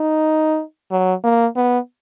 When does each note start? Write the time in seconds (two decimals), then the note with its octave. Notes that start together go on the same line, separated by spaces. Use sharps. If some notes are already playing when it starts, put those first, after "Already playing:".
Already playing: D#4
0.91 F#3
1.24 A#3
1.56 B3